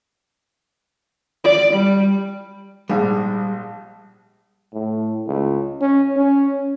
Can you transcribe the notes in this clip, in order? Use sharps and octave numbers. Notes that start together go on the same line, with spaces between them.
D5
G3
A#1 G#2 G3
A2
C#2
C#4
C#4